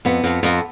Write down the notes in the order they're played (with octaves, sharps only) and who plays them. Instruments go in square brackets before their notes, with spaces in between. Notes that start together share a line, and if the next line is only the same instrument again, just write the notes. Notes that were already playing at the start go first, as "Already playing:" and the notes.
[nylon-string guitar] F2 B3
F2
F2